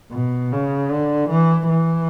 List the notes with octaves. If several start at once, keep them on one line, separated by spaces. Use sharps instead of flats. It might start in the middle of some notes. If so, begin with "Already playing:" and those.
B2
C#3
D3
E3
E3